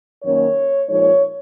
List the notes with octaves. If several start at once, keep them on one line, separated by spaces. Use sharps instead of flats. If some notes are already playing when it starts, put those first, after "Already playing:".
F#2 D#3 F#3 A#3 C#4 C#5
A#2 F3 G#3 D#4 C#5